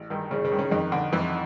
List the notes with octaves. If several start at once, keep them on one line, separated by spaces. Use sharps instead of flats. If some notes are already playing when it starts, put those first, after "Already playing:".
Already playing: A1
G2 D#3 D#4
A1 C#3 C#4
C#3 C#4
G2 D#3
C#3 C#4
F2 D#3 D#4
D3
F2 E3 E4